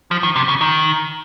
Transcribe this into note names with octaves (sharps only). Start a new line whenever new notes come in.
F3
D#3
C3
C#3
D#3